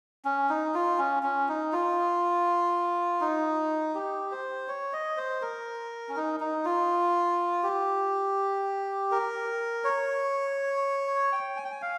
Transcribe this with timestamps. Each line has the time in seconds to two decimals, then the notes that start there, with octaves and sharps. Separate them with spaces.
0.25 C#4
0.49 D#4
0.74 F4
0.98 C#4
1.23 C#4
1.48 D#4
1.72 F4
3.21 D#4
3.95 G4
4.31 C5
4.68 C#5
4.93 D#5
5.17 C5
5.42 A#4
6.09 C#4
6.16 D#4
6.40 D#4
6.65 F4
7.63 G4
9.11 A#4
9.84 C#5
11.32 G5
11.57 G#5
11.64 G5
11.72 G#5
11.82 F5